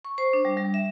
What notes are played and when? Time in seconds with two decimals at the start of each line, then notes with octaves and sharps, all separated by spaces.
0.05 C#6
0.18 C5
0.33 D4
0.45 G3
0.57 G3
0.74 E5